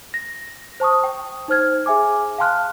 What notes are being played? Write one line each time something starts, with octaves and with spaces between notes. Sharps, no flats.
A#6
C5 A5 C#6 D#6
G5
D#4 C5 F6 G#6
G#4 E5 G#5 D6
F5 G5 A5 C6 F6 F#6